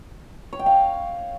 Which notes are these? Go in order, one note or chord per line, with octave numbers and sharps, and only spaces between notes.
C#5
G5
F5